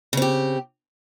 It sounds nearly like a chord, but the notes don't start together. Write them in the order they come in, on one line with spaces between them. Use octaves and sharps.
C#3 C4 G4